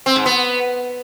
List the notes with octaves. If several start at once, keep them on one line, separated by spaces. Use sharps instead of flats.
C4
G#2
B3